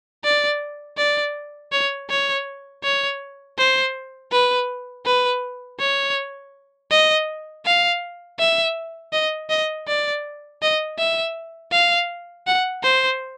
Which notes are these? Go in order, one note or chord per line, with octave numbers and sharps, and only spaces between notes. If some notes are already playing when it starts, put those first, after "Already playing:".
D5
D5
C#5
C#5
C#5
C5
B4
B4
C#5
D#5
F5
E5
D#5
D#5
D5
D#5
E5
F5
F#5
C5